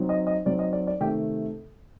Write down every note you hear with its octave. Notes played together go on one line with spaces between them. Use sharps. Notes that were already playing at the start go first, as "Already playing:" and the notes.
Already playing: F#3 C4 D#4
D#5
D#5
F#3 C4 D#4 D5
D#5
D5
D5
C3 D#3 A3 G4 G5